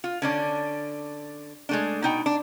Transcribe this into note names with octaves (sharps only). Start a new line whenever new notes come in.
F4
D3 C#4 D4
G#3 A3 D4
B2 D#4 G5
D4